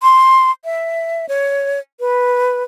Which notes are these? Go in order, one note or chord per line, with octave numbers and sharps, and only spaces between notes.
C6
E5
C#5
B4